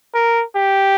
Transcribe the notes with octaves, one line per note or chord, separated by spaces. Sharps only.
A#4
G4